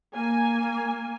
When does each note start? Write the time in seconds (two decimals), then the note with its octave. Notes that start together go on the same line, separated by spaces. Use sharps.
0.14 A#3 G#5